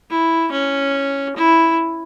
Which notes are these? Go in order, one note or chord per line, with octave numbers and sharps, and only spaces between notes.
E4
C#4
E4